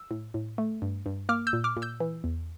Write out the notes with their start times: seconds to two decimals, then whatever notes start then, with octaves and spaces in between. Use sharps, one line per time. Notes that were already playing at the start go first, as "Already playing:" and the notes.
Already playing: E6
0.11 A2
0.34 A2
0.58 A3
0.82 G2
1.06 G2
1.29 A#3 D6 F6
1.47 E6 G6
1.53 A#2
1.64 D6 F6
1.77 A#2
1.82 E6 G6
2.00 E3
2.24 E2